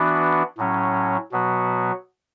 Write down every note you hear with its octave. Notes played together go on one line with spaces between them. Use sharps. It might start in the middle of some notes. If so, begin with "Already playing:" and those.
Already playing: E3 B3 D4 F#4
A2 F#3 C#4
B2 F#3 B3 F#4